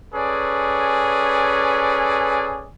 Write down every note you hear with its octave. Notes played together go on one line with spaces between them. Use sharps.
C#4 G#4 A4 B4 D5 G#5